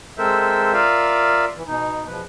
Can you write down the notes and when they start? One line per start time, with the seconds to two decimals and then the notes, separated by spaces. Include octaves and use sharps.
0.18 G#3 C4 A4 A#4 C5 E5
0.73 F4 A#4 D5 E5 F5
1.55 E3
1.67 B2 D#4
2.07 E2 B2 F3 B4